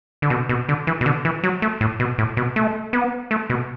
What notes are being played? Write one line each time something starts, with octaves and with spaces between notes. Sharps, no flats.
D3
B2
B2
D3
E3
B2
D3
E3
F#3
A3
A2
B2
A2
B2
A3
B3
A3
B2